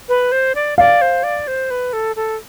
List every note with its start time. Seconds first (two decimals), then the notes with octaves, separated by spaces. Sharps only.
0.09 B4
0.32 C5
0.55 D5
0.78 D5 F5
1.02 C5
1.23 D5
1.47 C5
1.71 B4
1.93 A4
2.16 A4